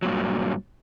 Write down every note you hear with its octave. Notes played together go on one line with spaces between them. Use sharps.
G2 A#2 F#3